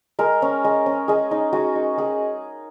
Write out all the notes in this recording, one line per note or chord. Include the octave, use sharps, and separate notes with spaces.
G#3 A#4
C#4
G#3
C#4
G#3 G#4
D#4
G#3 F#4
D#4
G#3 G#4